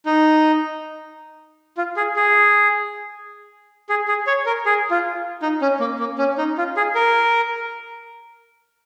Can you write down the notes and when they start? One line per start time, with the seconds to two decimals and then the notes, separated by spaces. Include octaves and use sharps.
0.06 D#4
1.77 F4
1.97 G#4
2.16 G#4
3.89 G#4
4.08 G#4
4.27 C#5
4.46 A#4
4.66 G#4
4.90 F4
5.42 D#4
5.61 C#4
5.80 A#3
5.99 A#3
6.18 C#4
6.38 D#4
6.58 F4
6.77 G#4
6.95 A#4